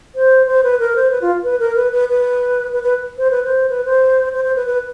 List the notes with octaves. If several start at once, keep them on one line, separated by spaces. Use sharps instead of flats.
C5
C5
B4
A#4
C5
B4
F4
B4
A#4
B4
B4
B4
B4
B4
C5
B4
C5
B4
C5
C5
C5
B4
B4